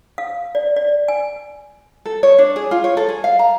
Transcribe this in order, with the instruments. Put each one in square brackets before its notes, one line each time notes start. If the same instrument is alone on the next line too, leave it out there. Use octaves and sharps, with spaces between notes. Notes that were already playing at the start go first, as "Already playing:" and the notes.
[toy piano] F5
D5
D5
G#5
[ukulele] A4
C#5
D4
G#4
F4
C#5
A4
G#4
F5
A#5